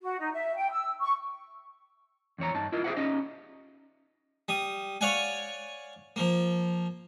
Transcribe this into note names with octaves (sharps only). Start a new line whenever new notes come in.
F#4
D#4
E5
G5
E6
C#6
E2 C4 C#5 A#5
G2 D#4 A5
E4 F4 A#4 D#5
G4 G#4 B4 C5 E5 F#5
C#4 D#4 G4 D#5
G3 D#6
C#5 D5 F5 F#5 G#5
F3 A#3